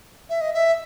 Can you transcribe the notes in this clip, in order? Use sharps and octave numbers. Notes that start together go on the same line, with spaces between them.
E5
D#5
E5